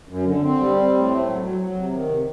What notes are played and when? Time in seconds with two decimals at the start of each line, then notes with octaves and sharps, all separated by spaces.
0.09 F#2
0.25 D3
0.42 C4
0.59 G3
0.77 C4
0.93 A2
1.10 A3
1.26 F#3
1.42 F#3
1.60 F#3
1.76 C3
1.93 D#3
2.09 C3